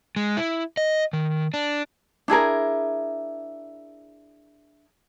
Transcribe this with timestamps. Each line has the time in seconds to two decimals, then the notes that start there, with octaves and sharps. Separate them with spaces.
0.16 G#3
0.37 E4
0.77 D#5
1.13 D#3
1.54 D4
2.28 D4 E4 G#4 A#4